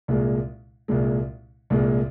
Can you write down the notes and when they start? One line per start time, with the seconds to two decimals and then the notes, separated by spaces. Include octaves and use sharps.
0.08 C2 A#2 G#3
0.88 C2 A#2 G#3
1.70 C2 A#2 G#3